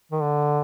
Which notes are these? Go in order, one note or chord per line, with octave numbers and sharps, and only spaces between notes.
D#3
D3